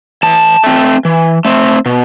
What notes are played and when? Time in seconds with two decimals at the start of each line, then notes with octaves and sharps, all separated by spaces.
0.23 E3 A5
0.64 A3 C4
1.05 E3
1.45 A3 C4
1.86 B2